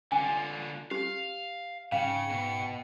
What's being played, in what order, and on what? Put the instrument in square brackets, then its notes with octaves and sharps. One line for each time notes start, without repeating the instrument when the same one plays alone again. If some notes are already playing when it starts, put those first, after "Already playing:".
[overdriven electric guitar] D3 F4 [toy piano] G#5
[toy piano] G4 [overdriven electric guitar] F5
[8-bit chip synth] G#2 G5 C#7 [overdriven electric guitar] C#3 [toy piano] F5
[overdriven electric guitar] B2